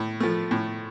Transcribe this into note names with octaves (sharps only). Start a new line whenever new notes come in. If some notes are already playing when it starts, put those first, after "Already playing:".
Already playing: A2
F3 A3
A2